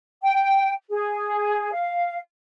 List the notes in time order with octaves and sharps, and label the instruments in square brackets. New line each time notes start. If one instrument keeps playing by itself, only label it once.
[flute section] G5
G#4
F5